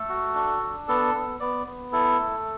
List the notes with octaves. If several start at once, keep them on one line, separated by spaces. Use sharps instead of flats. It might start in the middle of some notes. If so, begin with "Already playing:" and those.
Already playing: A3 A4
F#4
D4
D4
B3 A4
B3
B3 D5
B3
E4 A4
A3